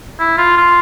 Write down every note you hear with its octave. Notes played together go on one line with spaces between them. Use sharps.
E4
F4
F4